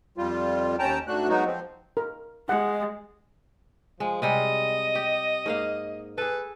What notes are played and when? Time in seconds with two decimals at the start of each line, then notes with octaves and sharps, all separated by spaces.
0.17 F2 G3 F4
0.79 D#2 C#4 G5 A5 A#5
1.07 G#2 A3 D4 F#4 F#6
1.29 F#3 G#3 B3 D#4 F#4
1.45 F3 C4
1.97 A#4
2.49 G#3 F#5
4.00 F3 G#3
4.22 C3 G3 G#3 D#5
4.95 G4
5.46 G#2 A#3 F5
6.18 G#4 A4 B4